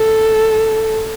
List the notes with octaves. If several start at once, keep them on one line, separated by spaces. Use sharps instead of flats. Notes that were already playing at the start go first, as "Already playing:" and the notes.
Already playing: A4